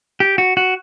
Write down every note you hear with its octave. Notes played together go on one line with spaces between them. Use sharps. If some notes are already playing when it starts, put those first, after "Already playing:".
G4
F#4
F#4